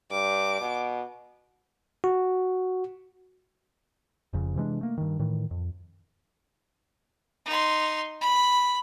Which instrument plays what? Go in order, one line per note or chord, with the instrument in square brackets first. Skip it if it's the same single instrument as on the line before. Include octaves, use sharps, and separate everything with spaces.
[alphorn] G2 [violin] D6
[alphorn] B2
[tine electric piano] F#4
[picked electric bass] F1 F2 C#3
C3 E3 G#3 D4
A3 A#3
G2 D#3
A2 D#3 E3
F2
[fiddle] D#4 C6
B5